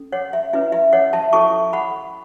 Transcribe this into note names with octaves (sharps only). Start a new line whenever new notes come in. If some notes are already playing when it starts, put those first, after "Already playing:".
Already playing: C#4 A4
C#5 F#5
E5
C#4 E4 B4 E5
E5
C#5 F#5
E5 A5
E4 A4 C#5 A5 C#6
F#5 B5